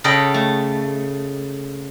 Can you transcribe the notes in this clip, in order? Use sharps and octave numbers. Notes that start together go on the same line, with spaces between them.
C#3 A4 D#5 G5 B5
A3